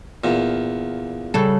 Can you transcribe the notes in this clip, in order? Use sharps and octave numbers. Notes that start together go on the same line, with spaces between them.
E2 A#2
C#3 G3 A4